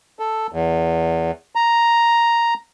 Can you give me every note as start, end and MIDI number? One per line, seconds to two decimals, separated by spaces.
0.19 0.47 69
0.52 1.31 40
1.55 2.54 82